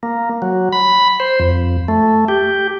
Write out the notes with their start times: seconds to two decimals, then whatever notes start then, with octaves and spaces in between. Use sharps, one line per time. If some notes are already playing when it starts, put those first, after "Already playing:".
0.03 A#3
0.42 F#3
0.73 B5
1.20 C5
1.40 F2
1.88 A3
2.28 G4